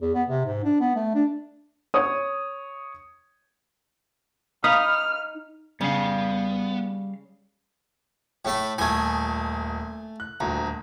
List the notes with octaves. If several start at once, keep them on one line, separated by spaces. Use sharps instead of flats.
E2
B3
C3
G#2
D4
B3
A3
D4
C#5 D#6
D#4 F5 B5 D#6 F6
C#3 G3 B3 F5
A2 A3 B5
D#1 A3 G#5 G#6
F#6
D#1 D2 A#5